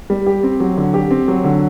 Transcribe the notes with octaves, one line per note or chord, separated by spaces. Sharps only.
G3
G4
C4
F#3
D3
G4
C4
F#3
D3